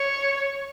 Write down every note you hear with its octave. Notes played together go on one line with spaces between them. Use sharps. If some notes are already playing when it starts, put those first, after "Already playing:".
Already playing: C#5